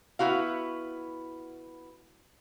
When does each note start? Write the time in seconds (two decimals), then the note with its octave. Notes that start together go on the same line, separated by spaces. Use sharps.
0.19 B3 E4 F#4 F5